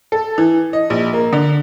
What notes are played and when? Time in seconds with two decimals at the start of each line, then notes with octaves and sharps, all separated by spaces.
0.12 A4
0.38 E3
0.73 D#5
0.90 A#1
1.13 A#3
1.33 D3